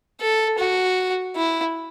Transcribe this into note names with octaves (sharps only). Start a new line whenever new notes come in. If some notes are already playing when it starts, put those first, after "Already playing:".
A4
F#4
E4